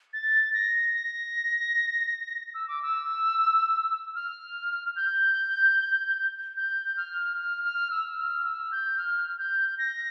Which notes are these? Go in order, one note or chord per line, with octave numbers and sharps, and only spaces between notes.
A6
A#6
A#6
E6
D6
E6
F6
G6
G6
F6
F6
F6
E6
F6
E6
G6
F6
G6
A#6